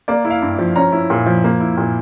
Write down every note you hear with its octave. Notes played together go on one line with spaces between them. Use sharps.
A#3 D5
E4
F5
G2
F3
C#4 A#5
E4
A#2
F3
A#3
E4
A#2